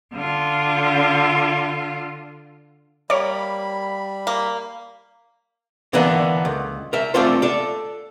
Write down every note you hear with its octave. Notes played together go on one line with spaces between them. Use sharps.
D3 F4
G3 A#3 C#5 D5 B5
A#3
D3 E3 A#3 B3 D4 D#4
C#2
A#4 E5
A3 C4 D4 F4 A4 C5
A4 D5